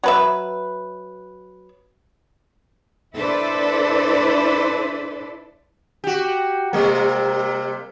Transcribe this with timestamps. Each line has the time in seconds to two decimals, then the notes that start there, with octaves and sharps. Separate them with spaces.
0.04 F#3 B4 E5
3.16 D4 E4 A4 B4 C5 D5
6.04 F#4 G4
6.73 C3 G3 A#3